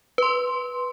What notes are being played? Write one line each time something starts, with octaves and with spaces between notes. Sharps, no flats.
B4 C6